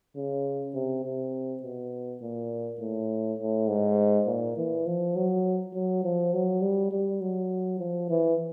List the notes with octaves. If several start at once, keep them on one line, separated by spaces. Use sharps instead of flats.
C#3
C3
C3
B2
A#2
A2
A2
G#2
A#2
E3
F3
F#3
F#3
F3
F#3
G3
G3
F#3
F3
E3